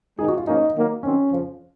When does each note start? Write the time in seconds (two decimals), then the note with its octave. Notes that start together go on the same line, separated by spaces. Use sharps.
0.18 G#2 D#3 G#3 D#4 G#4
0.28 F#4
0.37 F4
0.47 G#2 F3 A#3 C#4 D#4
0.75 D#3 F#3 A#3 D#4
1.03 D#3 F#3 C4 C#4
1.31 F2 C#3 F3